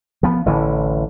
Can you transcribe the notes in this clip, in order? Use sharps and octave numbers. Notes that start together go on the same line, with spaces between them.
F3 B3
A1 D3 E3